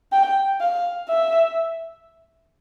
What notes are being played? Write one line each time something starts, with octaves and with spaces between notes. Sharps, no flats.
G5
F5
E5